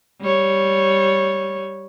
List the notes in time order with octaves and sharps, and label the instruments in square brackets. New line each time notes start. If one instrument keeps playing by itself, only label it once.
[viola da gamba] G3 C#5